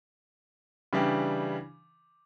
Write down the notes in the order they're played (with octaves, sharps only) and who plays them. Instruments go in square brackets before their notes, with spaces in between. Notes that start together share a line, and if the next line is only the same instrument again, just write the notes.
[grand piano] C#3 E3 G3 D4 G4